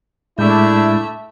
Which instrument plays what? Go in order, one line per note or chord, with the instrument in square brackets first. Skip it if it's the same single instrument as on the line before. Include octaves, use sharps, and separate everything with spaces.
[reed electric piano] A2 G#3 G6 [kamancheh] A3 E5 [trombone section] D4 E4